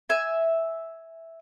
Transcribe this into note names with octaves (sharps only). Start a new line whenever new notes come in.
E5 G#5